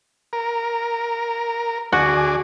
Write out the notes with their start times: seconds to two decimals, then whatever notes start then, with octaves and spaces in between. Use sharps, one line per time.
0.33 A#4
1.92 D2 F#4 G#4 D5